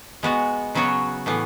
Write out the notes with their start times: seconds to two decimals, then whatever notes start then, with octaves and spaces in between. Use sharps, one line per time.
0.23 G#3 B3 F#4
0.75 C#3 F#3 B3 F#4 C#5
1.26 A2 E3 B3